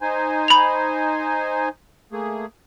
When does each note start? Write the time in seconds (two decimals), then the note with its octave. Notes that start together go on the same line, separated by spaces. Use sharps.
0.01 D#4 C5 G#5
0.48 B5 F7
2.12 A3 A#3 G#4